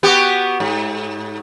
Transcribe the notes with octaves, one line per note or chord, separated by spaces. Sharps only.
B3 F#4 G4
G#2